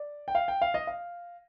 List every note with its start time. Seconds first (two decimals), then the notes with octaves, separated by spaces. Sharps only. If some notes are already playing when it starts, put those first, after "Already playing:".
Already playing: D5
0.28 G5
0.35 F5
0.48 G5
0.62 F5
0.74 D#5
0.87 F5